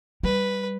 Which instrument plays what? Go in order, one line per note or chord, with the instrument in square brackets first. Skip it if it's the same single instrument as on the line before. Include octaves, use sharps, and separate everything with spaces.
[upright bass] G3 [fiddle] B4